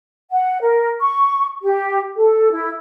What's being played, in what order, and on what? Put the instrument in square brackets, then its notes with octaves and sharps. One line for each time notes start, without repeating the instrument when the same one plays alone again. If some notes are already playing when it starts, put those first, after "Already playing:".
[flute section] F#5
A#4
C#6
G4
A4
E4